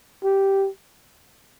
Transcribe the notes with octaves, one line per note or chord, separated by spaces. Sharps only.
G4